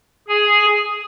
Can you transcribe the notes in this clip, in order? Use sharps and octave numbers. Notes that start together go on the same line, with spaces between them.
G#4 G#5